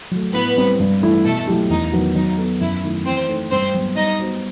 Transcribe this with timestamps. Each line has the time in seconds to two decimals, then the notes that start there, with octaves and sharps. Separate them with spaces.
0.11 F#3 A3
0.33 A2 B3 B4
0.57 G3 C4
0.80 G2
1.01 E3 A3 E4
1.24 B2 A3 A4
1.47 F#3 A3 E4 G4
1.70 E2 D#4
1.92 D#3 F#3 B3 F#4
2.15 F#3 D#4
2.37 B3 F#4 A4
2.60 F#2 E4
2.83 D#3 A3 E4
3.05 E3 C4 C5
3.28 A3 D#4 A4 C5
3.51 G2 C4 C5
3.73 F#3 B3
3.96 G3 D#4 D#5
4.20 B3 F#4 C5